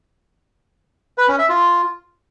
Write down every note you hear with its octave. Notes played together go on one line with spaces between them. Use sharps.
B4
C#4
E5
F4